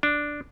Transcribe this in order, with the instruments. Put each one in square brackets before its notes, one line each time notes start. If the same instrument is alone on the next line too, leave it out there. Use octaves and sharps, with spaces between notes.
[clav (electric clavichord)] D4